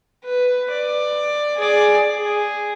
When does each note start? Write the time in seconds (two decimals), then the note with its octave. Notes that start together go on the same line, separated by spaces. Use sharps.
0.25 B4
0.71 D5
1.58 G#4 D5
2.19 G#4